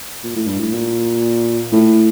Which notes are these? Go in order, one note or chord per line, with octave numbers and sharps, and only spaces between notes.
A#2
A2
G2
A2
A#2
A2